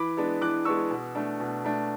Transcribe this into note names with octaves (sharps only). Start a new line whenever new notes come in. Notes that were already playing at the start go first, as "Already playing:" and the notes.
Already playing: E3 B5 D6
G#3 B3 D4
E3 D6 F#6
G#3 B3 D4 C#6 E6
B2
A3 D4
B2
A3 D4